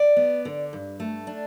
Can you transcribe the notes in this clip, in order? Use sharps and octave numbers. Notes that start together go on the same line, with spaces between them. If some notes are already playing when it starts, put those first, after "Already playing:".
Already playing: D5
B3
D3
G2
A3
D4